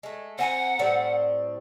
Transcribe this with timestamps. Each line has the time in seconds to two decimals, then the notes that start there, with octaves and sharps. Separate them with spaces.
0.03 G#3 A3
0.38 C4 F#5 G#5 A#5
0.79 A2 G3 C4